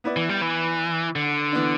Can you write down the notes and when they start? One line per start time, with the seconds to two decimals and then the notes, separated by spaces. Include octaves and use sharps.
0.04 B3 E4 B4 D5
0.16 E3
0.29 G3
0.41 E3
1.16 D3
1.52 E3 B3 D4